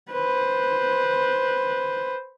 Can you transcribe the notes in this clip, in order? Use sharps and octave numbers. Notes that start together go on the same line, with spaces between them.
B4 C5